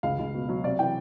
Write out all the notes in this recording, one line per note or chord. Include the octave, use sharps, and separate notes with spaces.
C#2 F5
C#2
B2
F#3
C3 D5
E3 G5